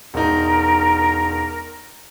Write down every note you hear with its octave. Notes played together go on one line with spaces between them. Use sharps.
E1 D#4 A#4